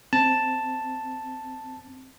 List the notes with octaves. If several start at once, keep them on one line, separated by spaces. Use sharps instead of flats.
C4 A5